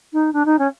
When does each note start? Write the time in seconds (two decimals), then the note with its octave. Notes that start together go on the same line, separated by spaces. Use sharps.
0.13 D#4
0.33 D4
0.45 D#4
0.58 C#4